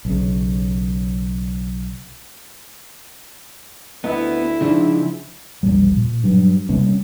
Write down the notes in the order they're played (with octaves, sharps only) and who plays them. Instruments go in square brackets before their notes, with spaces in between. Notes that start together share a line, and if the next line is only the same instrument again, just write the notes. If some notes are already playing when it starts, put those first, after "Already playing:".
[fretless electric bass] B1 C#3
[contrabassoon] D2 [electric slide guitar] B3 [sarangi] E4
[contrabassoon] G#2 [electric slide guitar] C#3 F3 [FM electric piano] D4
[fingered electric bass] E1 A#1 G3
A#2
G2 F#3
C3 G3 A#3 C#4